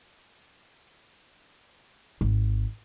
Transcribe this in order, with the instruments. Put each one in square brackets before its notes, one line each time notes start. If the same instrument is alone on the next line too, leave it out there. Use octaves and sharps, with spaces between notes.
[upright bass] G#1